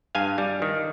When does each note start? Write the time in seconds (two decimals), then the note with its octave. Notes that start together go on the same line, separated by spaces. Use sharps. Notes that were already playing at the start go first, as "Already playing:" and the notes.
0.15 G2 F5 G#5
0.38 G3
0.62 D#3